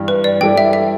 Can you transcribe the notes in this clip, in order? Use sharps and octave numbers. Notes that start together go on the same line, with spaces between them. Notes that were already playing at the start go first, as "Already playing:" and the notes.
Already playing: G2 E3 G3
B4
D5
G3 E4 A4 D5 G5
E5
E5